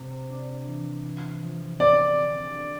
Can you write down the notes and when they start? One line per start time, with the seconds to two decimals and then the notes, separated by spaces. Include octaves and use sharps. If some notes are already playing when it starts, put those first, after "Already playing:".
Already playing: C3 C4
0.30 D4
0.67 E3
1.05 E4
1.43 F3
1.79 C4 D5
2.17 D3
2.56 A4